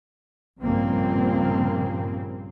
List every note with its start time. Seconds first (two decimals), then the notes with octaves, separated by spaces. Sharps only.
0.62 A#1 G2 C#3 F3 A#3 C4